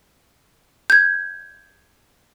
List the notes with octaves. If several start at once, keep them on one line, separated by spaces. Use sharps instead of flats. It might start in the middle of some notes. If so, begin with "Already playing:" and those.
G6 G#6